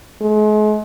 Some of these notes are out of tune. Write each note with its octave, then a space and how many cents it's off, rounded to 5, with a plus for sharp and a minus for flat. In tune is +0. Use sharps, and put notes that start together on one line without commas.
G#3 +40